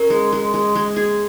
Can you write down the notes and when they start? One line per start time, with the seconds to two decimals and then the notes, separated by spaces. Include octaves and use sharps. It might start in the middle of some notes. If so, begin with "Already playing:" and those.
Already playing: C#4 A#4
0.10 G#3
0.32 G#3
0.54 G#3
0.75 G#3
0.96 G#4